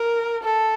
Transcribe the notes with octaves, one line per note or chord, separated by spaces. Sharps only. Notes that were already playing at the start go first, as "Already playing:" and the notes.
Already playing: A#4
A4